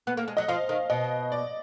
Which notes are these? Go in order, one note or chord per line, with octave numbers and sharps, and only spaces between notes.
B3
A#3
G#3
F#3 D#5
F3 F5
D#3
B2 D#5
D5